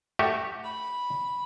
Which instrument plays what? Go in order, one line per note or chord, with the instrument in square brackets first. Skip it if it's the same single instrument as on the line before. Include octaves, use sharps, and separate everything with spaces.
[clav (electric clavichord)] A3 F#4 G4
[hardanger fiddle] B5